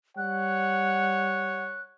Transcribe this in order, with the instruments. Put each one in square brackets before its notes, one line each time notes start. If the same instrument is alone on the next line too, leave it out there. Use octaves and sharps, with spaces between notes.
[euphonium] G3 [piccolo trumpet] C#5 [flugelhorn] F#5 [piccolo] F#6